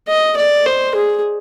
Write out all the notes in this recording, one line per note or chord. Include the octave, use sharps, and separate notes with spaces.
D#5
D5
C5
G#4